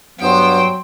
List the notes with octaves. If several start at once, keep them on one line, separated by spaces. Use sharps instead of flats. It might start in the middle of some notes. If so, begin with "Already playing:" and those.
G2 F#3 B3 C5 G5